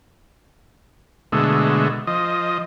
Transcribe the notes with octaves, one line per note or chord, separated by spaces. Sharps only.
B2 D3 G#3 A3
F3 D#5